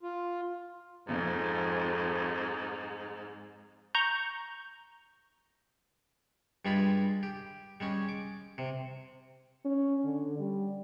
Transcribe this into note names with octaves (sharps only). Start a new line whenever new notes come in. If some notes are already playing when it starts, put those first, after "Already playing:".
F4
F2 G#2
A#5 C#6 G6
G2 G3 G#3 F4 B5
G4
G3 G#3 C#4
D6
C3
C#4
D3
G3